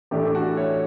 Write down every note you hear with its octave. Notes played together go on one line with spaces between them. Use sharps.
A2 E3 A3 D4 G4
G4
F#4 A4
C#5 E5